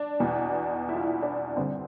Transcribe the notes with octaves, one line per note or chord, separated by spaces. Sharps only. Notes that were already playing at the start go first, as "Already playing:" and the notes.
Already playing: D4
E2 B2
E4
F4
E4
D4
G2 D3 C4